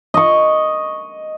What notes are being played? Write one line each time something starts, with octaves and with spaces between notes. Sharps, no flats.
D#5 C#6